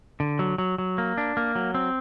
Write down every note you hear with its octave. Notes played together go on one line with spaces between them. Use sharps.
D3
F#3
F#3
F#3
A#3
D4
A#3
F#3
C4